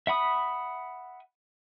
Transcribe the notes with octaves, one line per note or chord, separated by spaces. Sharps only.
E5 F#5 B5 D#6